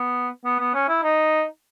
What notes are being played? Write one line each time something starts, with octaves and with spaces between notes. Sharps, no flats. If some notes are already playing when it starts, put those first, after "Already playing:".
Already playing: B3
B3
B3
C#4
E4
D#4